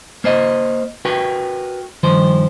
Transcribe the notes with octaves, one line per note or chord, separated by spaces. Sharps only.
A#3 C5 D#5
F#4 A#4 B4 G5
G2 D#3 F3 C5